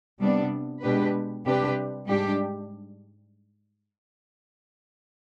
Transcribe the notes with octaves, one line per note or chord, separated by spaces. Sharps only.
C3 G3 B3 D4
B2 G#3 D4 G4 B4
C3 G3 D4 G4 B4
G#2 G3 D4 G4